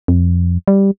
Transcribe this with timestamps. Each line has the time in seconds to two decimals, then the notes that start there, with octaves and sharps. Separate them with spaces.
0.08 F2
0.68 G3